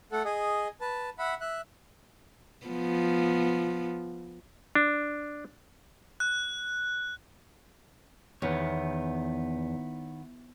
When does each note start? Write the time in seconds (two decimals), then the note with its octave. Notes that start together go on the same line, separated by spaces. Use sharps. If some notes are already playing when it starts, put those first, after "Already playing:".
0.12 A3 A4 F#5
0.25 G#4 D#5
0.81 B4 A5
1.19 E5 F#5 B5
1.41 E5 F#6
2.67 F3 B3
4.75 D4
6.20 F#6
8.42 E2 D#3 B3 C#5